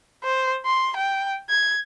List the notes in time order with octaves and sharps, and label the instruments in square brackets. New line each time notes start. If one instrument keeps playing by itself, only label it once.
[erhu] C5
C6
G5
G#6